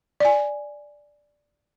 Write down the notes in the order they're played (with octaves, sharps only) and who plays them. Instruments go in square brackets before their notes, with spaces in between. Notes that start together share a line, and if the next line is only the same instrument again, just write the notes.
[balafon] D5 G#5